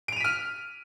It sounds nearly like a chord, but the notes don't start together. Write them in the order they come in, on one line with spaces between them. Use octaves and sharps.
D7 F7 D#7 B6 F6